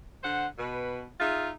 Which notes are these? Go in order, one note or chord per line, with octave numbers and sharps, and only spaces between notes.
D3 C5 F#5
B2 B4
D#4 F4 G#4 E5